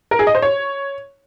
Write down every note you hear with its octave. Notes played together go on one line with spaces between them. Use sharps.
A#4
G#4
D#5
C5
C#5